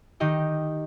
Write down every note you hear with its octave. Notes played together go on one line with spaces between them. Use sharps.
D#3 D#4 G4 D#5